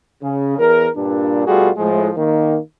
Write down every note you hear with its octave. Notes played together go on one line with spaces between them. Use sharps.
C#3
E2 A#4
G2 A#2 D4
B2 G3 A3 F4 F#4 G#4
A2 F3 G#3
D#3 A#3